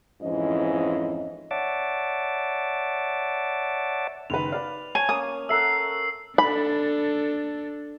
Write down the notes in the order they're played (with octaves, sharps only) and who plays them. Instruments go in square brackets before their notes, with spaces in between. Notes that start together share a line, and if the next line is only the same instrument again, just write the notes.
[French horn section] F2 G#2 E3 C#4 E4 D#5
[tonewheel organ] C#5 D5 E5 F#5 A5 D6
[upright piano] F#1 D#3 B4 [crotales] F7
[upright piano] B4 D5 [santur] F5
[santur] C#5 [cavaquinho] G#5 [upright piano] A5
[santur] A#3 C#4 [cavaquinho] D#6
[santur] A4 A#4 F#5 [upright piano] E5 [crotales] E6 C7
[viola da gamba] D4 A4 [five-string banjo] B5